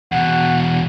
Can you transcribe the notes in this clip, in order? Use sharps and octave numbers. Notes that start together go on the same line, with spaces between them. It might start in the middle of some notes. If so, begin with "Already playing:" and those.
E2 B2 F#5